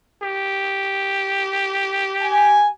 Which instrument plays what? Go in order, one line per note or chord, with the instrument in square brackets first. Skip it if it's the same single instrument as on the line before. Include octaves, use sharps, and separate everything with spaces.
[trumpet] G4
[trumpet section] G#5